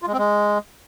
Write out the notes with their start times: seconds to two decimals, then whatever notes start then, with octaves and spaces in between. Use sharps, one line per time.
0.02 F4
0.08 G#3
0.13 C4
0.18 G#3